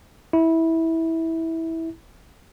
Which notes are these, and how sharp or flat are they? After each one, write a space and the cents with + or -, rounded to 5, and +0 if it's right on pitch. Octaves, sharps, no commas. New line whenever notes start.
E4 -15